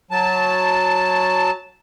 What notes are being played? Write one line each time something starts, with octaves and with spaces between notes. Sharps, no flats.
F#3 A5